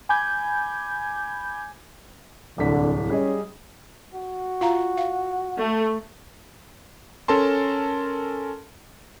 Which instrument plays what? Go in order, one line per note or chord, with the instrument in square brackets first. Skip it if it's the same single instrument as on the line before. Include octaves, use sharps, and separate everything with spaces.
[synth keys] G#5 B5 D6 G6 G#6
[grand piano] D1 C2 B6 [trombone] D3
[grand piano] G3 G#4 D#5 [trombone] C#4
[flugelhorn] F#4
[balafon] F4 F5 A#5
F5
[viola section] A3
[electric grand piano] C#4 A4 A#4 A5 C6